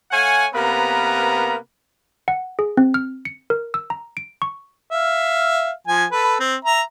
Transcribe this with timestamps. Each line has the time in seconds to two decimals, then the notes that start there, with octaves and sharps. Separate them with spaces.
0.11 A3 C#5 F5 F#5 G#5
0.54 C3 A#3 B3 A#4 B4 A#5
2.28 F#5
2.59 G#4
2.77 C4
2.94 F6
3.25 C#7
3.50 A#4
3.74 E6
3.90 A#5
4.17 D7
4.42 C#6
4.91 E5 F5
5.88 F3 G#5
6.11 A4 B4
6.40 C4
6.65 E5 A#5